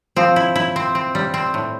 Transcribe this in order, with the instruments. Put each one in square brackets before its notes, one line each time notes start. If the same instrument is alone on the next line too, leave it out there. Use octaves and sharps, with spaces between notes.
[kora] F3 [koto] C4
[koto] E4
E4
C4
C4
G3
C4
A2